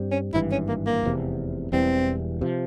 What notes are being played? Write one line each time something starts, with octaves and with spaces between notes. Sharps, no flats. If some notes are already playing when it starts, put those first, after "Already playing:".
Already playing: G2 G3 C4
C#4
G#1 G2 E3 E4
C#4
A#3
A#3
F1 E2 C3
E1 E2 E3 G3 C4
C3 F3